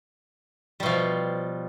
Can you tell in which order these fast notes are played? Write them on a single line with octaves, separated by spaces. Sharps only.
G3 B2 F3